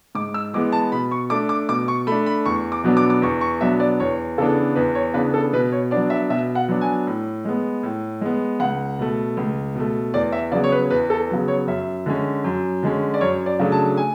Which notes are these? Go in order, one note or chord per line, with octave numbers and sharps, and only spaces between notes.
G#2 D6
E6
E3 G#3 B3 D6
A5
B2 B5
C#6
A3 D4 D6
D6
B2 D6
C#6
A3 D4 B5
B5
E2 C#6
D6
B2 F#3 B3 D4
D6
D6
E2 C#6
C#6
B2 F#3 B3 D4 E5
D5
E2 C#5
C#3 E3 B3 D4 A4
E2 B4
C#5
C#3 E3 B3 D4 B4
A4
B2 B4
C#5
F#3 B3 D4 D5
E5
B2 E5
F#5
F#3 B3 D4
G#5
A2
G#3 B3
A2
G#3 B3
C#2 F#5
B2 A3
C#2
B2 A3
E2 D5
E5
C#3 F#3 B3 D5
C#5
B4
E2 B4
A4
C#3 F#3 B3
C#5
F#2 E5
D3 G#3 C#4
F#2
D3 G#3 C#4
D5
F#2 C#5
D5
C#3 F#3 A3 D4
A5
G#5